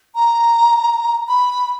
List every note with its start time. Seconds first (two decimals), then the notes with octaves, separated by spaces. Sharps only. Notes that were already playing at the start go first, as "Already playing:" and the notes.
0.15 A#5
1.29 B5